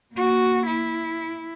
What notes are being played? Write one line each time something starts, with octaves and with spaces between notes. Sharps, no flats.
A#3 F#4
E4